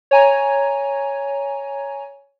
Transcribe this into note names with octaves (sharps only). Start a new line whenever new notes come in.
C#5 G#5 A#5